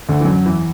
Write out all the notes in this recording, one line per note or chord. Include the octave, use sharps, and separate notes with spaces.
D2 D3
E3
F#2 F#3
E2 E3